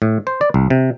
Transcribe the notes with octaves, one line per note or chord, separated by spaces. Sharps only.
A2
C5
D5
C2
C3